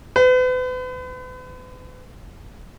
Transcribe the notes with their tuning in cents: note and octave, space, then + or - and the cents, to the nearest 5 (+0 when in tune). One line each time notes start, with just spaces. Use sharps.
B4 +40